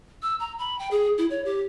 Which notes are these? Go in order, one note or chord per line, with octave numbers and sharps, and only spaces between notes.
E6
A#5
B5
G5
G#4
E4
C#5
G4